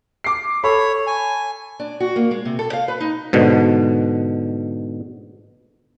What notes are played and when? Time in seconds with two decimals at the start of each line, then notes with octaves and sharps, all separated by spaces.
0.24 D6 C7
0.64 A4 C#5 B5
1.07 G#5
1.80 D4
2.00 F#4
2.16 A#3
2.31 G#3
2.45 C3
2.59 A4
2.73 F5
2.88 B4
3.00 D#4
3.33 G#2 B2 D3